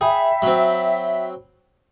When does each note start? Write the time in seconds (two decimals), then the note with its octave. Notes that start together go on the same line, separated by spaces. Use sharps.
0.01 G#4 E5 G5 B5
0.42 F#3 C4